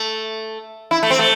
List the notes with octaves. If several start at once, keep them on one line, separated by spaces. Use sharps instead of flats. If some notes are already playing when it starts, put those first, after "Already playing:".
Already playing: A3
E4
A3
C4
A3